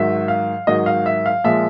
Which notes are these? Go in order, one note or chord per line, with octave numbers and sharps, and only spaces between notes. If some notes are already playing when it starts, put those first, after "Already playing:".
Already playing: G#2 D#3 F#3 E5
F5
G#2 D#3 F#3 D#5
F5
E5
F5
A#2 F3 G#3 E5